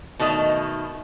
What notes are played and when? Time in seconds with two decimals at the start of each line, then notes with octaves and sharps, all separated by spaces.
0.19 B2 D#3 A3 D#5